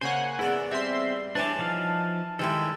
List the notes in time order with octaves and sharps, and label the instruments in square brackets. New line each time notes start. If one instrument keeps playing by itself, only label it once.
[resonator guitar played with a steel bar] C#3 A#3 C#5 [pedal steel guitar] C5 [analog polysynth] F#5 G#5
[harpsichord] E2 A4 D5 [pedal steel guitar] B3 E4
[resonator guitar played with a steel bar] G3 [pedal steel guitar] C4 [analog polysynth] E5 C6
[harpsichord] E3 C#4 E4 [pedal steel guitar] D4 G4 [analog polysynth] A5
[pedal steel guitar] F3 D#4 F5
[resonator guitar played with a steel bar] D#3 G#3 E4 [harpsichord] E3 G3 G4 [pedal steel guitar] A4